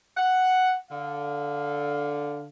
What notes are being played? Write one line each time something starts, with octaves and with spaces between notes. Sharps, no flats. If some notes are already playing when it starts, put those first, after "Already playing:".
F#5
D3 F5